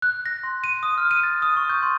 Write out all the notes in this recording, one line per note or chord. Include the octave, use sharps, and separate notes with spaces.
F#6
A#6
C6
D#7
D#6
F6
D#7
A6
D#6
C#6
G6
C6